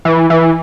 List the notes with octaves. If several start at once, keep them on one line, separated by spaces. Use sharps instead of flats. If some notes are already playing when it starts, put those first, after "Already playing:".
E3
E3